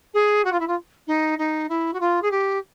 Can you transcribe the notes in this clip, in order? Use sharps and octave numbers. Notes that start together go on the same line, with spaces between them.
G#4
F#4
F4
E4
F4
D#4
D#4
E4
F#4
F4
G#4
G4